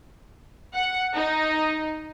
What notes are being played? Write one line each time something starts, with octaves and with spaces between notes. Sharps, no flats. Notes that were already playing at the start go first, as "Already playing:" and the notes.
F#5
D#4